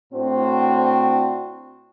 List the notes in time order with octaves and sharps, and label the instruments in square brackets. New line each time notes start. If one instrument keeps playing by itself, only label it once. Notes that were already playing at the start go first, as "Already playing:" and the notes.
[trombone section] A2 C4 D4 F#4 C5